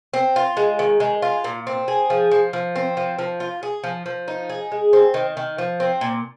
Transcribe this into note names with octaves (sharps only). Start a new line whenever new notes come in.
C4
F4
G#3
D#3
G#3
F4
A#2
C4
G#4
F3
F3
F3
C4
F3
F3
F4
G#4
F3
F3
D#4
G#4
G#3
C4
D#3
D#3
F3
C4
A#2